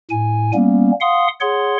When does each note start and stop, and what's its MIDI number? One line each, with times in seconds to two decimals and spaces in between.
0.11 0.52 45
0.11 0.52 80
0.54 0.91 55
0.54 0.91 58
0.54 0.91 59
0.54 0.91 61
1.01 1.28 77
1.01 1.28 78
1.01 1.28 84
1.01 1.28 87
1.41 1.78 68
1.41 1.78 73
1.41 1.78 78
1.41 1.78 84